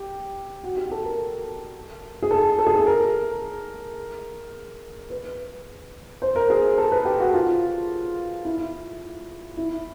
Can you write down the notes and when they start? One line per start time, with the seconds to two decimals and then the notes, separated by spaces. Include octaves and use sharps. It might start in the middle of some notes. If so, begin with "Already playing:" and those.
Already playing: G4
0.64 F#4
0.77 G4
0.91 A4
1.05 A#4
2.22 G#4
2.31 A4
2.59 A4
2.67 G#4
2.74 A4
2.87 A#4
5.10 B4
6.22 C5
6.36 A#4
6.50 G#4
6.78 A4
6.92 B4
7.05 G4
7.20 F#4
7.34 F4
8.45 E4
9.57 E4